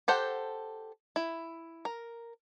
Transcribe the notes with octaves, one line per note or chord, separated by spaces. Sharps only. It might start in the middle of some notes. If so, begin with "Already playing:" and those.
G4 A4 C5 F#5
E4
A#4